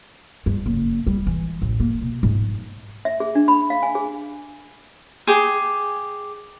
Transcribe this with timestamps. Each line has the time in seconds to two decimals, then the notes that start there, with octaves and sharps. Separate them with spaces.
0.46 G2
0.66 F#1
1.07 G3
1.27 E3
1.62 A1
1.80 A#3
2.01 B2
2.23 G#2
3.05 E5
3.20 G#4
3.35 D4
3.48 B5
3.70 F5
3.83 G#5
3.95 G#4
5.27 G4 G#4